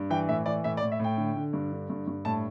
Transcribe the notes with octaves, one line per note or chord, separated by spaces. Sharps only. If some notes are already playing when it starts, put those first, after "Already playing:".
Already playing: G2
E3 G5
A2 E5
E3 D5
A2 E5
D5
A2
E5
A2 G5
D3
D3
G2
D3
G2
G2
A2 A5